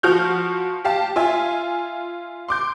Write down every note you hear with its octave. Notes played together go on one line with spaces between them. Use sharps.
F3 F#4 F6 G6
G4 F5 A5
F4 E5 G#5
C6 D6 G6